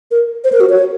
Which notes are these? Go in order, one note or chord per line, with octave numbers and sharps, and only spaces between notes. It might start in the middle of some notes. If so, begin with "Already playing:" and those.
A#4
C5
A#4
F#4
C#5